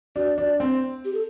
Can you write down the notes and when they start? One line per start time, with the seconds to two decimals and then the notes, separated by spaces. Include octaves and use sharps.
0.16 D4 F#4
0.38 D4
0.60 C4
1.05 G4
1.14 A4